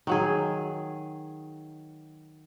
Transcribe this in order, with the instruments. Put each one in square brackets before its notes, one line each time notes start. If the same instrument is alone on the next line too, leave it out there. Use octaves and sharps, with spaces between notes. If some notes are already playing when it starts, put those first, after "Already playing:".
[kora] D#3 F#3 G#4